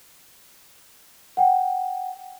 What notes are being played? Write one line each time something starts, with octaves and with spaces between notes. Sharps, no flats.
F#5 G5